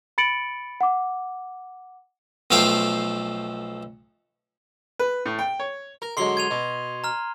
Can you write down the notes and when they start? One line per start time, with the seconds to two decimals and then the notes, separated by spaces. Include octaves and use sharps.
0.18 B5 A6 C#7 D7 F#7
0.81 F#5 D6
2.51 B1 F3 A3 F5 G5 C6
4.99 B4
5.26 A2
5.39 G5
5.59 C#5
6.02 A#4
6.17 D3 F#3 G#3 C6 C7 G7
6.37 G#6 D#7 F7
6.51 B2
7.04 A#5 F6